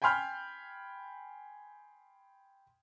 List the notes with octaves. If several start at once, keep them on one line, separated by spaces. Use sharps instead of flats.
G5 G#5 B5 C6 F6 G6